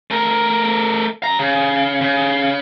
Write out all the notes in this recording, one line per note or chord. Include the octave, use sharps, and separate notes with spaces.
A3 A#4
F#2 A#5
C#3
C#3